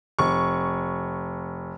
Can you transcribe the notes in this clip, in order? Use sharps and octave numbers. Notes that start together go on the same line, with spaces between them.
F1 C#6